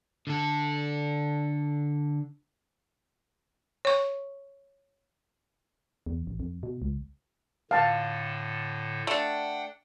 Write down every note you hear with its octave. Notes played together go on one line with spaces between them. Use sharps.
D3 A4
C#5 C#6
E2
A1
F2
B2
C#2
A2 D3 F5 A5
A3 D4 F#5 G5